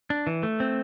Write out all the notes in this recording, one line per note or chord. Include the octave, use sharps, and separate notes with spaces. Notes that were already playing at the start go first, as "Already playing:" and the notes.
D4
E3
A3
C4